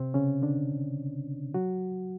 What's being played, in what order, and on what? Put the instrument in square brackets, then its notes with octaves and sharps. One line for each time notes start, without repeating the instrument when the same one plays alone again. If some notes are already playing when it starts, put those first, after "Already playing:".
Already playing: [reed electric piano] C3 C4
C#3 C#4
D3 D4
F#3 F#4